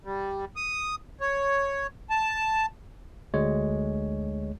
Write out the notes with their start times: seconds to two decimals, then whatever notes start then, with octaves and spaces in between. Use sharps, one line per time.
0.04 G3
0.56 D#6
1.21 C#5
2.10 A5
3.34 D2 G#3 C#5